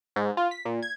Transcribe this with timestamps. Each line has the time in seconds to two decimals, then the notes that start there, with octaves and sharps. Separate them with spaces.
0.16 G#2
0.37 F4
0.51 B6
0.65 A#2
0.83 G#6